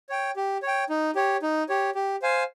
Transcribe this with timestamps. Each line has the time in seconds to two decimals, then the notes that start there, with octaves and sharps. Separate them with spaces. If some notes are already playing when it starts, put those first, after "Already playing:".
0.09 C#5 G5
0.36 G4
0.63 C#5
0.68 G5
0.90 D#4
1.15 G4 C#5
1.42 D#4
1.69 G4 C#5
1.95 G4
2.22 C5 F5 G#5